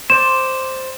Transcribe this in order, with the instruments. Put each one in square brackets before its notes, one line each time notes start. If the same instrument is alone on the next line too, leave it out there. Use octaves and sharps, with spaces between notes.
[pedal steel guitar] C5 D5 [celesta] E7